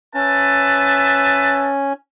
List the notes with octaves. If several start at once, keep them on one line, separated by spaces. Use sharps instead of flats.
C#4 B4 E5 A5